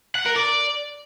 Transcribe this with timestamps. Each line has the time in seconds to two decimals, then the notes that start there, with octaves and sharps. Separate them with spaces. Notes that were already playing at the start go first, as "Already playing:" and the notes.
0.15 F#5
0.26 A#4
0.36 D5